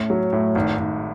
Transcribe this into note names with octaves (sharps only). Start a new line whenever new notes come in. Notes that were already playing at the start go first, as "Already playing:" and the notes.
Already playing: A2 C#4
F#3
A2
G#1
G#1